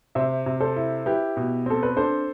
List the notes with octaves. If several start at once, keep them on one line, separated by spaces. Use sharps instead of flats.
C3 C5 E5
C3
A4 C5
E4
E4 G4 B4
B2
C4 A4
B4
D4 A4 C5